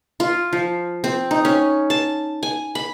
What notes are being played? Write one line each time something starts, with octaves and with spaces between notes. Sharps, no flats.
F4
F3
C4
D#4
C#4
A5
G#5
B5